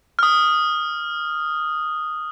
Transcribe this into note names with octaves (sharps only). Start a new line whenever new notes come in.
D#6 F6